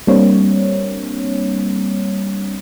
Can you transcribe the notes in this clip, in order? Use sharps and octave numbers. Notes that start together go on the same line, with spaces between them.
G3 A#3 C4 D4 C#5